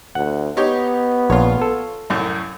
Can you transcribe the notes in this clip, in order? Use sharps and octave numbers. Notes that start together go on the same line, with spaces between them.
D2 F#5
B3 D#4 G4 C#5
A#1 F4 C#5
A4
C2 F#2 A2